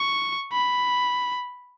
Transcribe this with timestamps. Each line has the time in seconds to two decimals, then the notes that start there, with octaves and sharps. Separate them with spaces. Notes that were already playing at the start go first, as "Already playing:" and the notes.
Already playing: C#6
0.52 B5